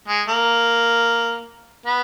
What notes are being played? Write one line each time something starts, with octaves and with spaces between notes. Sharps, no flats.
G#3
A#3
B3